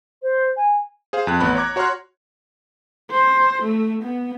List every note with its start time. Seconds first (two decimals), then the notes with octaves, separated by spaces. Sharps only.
0.22 C5
0.57 G#5
1.13 G#4 C5 F5
1.27 F2 F#6
1.40 A1 B3 B5 F#6
1.55 C#5 A#5 D6 G#6
1.76 F#4 C#5 A#5 C6 F6 F#6
3.11 C5
3.62 A3
4.03 B3